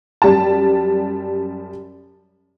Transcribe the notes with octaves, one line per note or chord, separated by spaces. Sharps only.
F#2 G3 A5